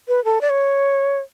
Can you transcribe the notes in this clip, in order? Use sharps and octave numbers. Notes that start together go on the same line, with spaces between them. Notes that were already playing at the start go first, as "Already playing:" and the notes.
B4
A4
D5
C#5